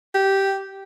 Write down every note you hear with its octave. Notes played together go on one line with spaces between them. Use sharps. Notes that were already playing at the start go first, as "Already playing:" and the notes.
G4